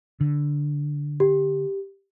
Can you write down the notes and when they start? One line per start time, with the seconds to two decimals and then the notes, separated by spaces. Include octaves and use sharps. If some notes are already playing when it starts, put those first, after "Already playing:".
0.21 D3
1.20 G4